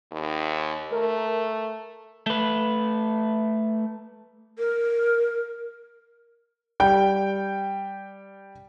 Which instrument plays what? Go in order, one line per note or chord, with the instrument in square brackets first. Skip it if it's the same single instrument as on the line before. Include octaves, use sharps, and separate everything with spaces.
[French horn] D#2
[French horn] A3 [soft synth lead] A#4
[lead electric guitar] A3 B4
[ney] A#4
[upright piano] G3 G5 G6